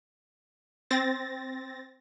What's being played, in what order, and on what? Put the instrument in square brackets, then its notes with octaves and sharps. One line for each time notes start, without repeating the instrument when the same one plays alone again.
[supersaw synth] C4 A6 A#6